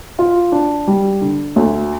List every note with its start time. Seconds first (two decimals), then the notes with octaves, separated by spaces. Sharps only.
0.19 F4
0.52 D4
0.87 G3
1.21 D3
1.56 D2